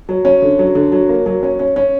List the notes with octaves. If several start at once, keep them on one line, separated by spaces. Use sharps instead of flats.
F#3
C#4
D3
F#3
D3
F#3
A#3
F#3
C#4
C#4
C#4